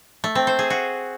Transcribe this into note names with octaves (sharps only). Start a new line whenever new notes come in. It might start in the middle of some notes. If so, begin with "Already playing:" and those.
A3
C4
C5
G#4
F#4